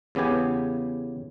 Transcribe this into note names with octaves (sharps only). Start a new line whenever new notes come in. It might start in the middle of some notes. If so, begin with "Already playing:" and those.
E2 C#3 B3 G4 G#5